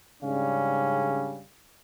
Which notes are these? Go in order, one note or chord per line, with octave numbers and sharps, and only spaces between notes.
G#2 C#3 G3 C#4 D4 F5